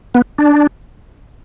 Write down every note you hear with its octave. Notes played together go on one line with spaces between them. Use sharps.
B3
D4